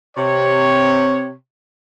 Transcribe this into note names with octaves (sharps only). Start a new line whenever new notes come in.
C3 C#5